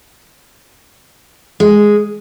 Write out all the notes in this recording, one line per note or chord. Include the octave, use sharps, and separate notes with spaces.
G#3